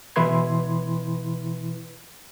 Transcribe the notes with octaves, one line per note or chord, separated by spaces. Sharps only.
B2 E3 E4 B4 C6 G#6